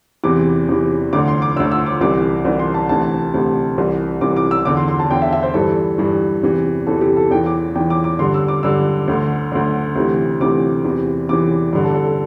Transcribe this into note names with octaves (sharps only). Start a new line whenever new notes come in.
E2 C3 E3 D6
E2 C3 E3
D2 D3 D6
C6
D6
D2 D3 E6
E6
D6
C2 C3 E3 D6
C2 C3 E3
C6
A5
D2 C3 E3 A5
D2 C3 E3
C2 C3 E3
C2 C3 E3 D6
D6
E6
E2 D3 D6
C6
C6
A5
E2 D3 G5
E5
E5
C5
G2 E3 A4
G2 E3
E2 C3 E3
E2 C3 E3 A4
G4
A4
E2 E3 G5
D6
E2 E3 G5
D6
D6
G2 D3 C6
E6
D6
G2 D3 E6
D2 D3
D2 D3
D2 C3 E3
D2 C3 E3 D6
E2 C3 E3
E2 C3 E3 D6
G2 D3
A4
A4
A4